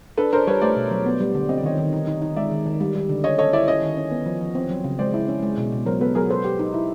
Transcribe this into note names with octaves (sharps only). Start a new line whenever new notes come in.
D4 A4 B4
D4 A#4 C5
G3 B4 C#5
A3 C5 D5
B2
F#3
B3
G3
D3
C4 D#5
D5
D#3 C#5 D#5
D#3
D#4
D#4
D#4
G#3 D5 E5
D#3
D#3
G3
G3
D3
C#4 C#5 D#5
A4 C#5 D#5
E4 D5 E5
C#4 C#5 D#5
D#3
C#4
B3
F3
F3
C4
F#3
C#3
G#3 C5 D5
E4
C#4
G#3
B2
B2
F#3 A#4 C5
B3 A4 B4
F#3 G#4 A#4
A4 B4 C5
G4
D#4
E4